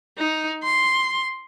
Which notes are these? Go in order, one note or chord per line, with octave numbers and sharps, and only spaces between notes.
D#4
C6